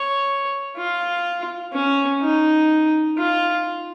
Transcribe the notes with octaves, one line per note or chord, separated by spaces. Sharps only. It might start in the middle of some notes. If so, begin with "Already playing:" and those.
Already playing: C#5
F4
C#4
D#4
F4